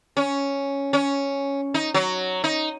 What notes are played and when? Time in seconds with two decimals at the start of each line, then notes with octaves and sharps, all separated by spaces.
0.17 C#4
0.93 C#4
1.74 D#4
1.94 F#3
2.44 D#4